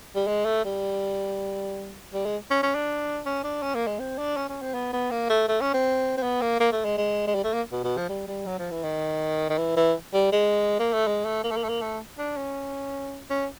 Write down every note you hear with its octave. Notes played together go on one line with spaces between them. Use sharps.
G3
G#3
A3
G3
G3
G#3
C#4
C#4
D4
C#4
D4
C#4
A#3
G#3
C4
D4
C#4
C#4
C4
B3
B3
A#3
A3
A3
C#4
C4
C4
B3
A#3
A#3
A3
G#3
G#3
G#3
G3
A3
A#3
B2
B2
F3
G3
G3
F#3
F3
E3
D#3
D#3
E3
E3
G3
G#3
A#3
A3
G#3
A3
A#3
A3
A#3
A3
A#3
A3
D4
C#4
C#4